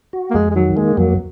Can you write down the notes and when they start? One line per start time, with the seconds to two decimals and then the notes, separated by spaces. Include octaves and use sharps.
0.13 F#4
0.31 A#3
0.34 F2 G#3
0.51 G#3
0.55 D#3 F#3
0.77 G#3 A#3
0.97 F2 F#3